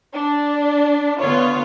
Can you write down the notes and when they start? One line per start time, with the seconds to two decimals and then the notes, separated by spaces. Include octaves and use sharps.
0.13 D4
1.21 D3 B3 F4 C#5